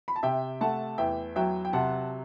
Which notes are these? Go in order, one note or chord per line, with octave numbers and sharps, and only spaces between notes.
B5
A5
C3 E5 G5
A3 F#5 A5
E2 E5 G5
F#3 E5 G5
G5
C3 F#5 A5